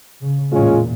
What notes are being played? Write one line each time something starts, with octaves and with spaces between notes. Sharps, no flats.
C#3
A1 E2 A#2 G#3 C#4 F4